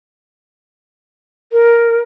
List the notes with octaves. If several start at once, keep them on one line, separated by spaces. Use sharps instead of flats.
A#4